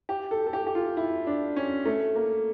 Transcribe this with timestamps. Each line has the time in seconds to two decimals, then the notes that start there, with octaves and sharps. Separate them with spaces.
0.09 G4
0.31 A4
0.47 A4
0.53 G4
0.67 G4
0.75 F4
0.97 E4
1.27 D4
1.56 C#4
1.86 A3
2.15 A#3